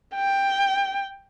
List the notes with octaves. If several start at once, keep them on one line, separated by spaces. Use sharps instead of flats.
G5